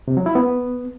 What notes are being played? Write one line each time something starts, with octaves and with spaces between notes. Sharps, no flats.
C3
F#3
E4
B3